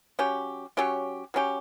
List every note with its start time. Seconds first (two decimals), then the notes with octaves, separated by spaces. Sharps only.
0.19 F#3 C#4 G4
0.77 F#3 C#4 G4
1.34 F#3 C#4 G4